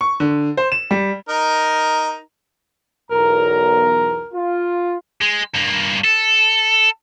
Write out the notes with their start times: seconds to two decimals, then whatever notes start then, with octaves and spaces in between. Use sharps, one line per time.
0.01 C#6
0.20 D3
0.57 C5
0.72 E7
0.91 G3
1.29 D#4 A#4
3.11 B1 E2 A#4 A#5
4.33 F4
5.21 G#3
5.54 G2 A#3
6.04 A4